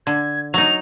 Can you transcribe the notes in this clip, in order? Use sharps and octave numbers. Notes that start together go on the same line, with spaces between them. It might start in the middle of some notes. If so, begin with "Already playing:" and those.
D3 G#6
F#3 D#4 F7